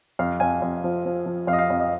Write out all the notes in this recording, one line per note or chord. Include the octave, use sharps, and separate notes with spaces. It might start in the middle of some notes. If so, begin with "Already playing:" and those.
F2 F5
F2 G#5
F2
F3
F3
F3
F2 F5
D#5
F5
F2
D#5